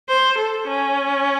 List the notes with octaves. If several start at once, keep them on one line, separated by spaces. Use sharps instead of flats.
C5
A4
C#4